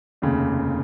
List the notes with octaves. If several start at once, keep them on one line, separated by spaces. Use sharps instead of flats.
F1 D#2 C#3